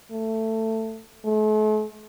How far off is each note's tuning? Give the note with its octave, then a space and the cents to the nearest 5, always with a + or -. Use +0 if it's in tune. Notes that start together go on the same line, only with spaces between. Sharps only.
A3 +15
A3 -45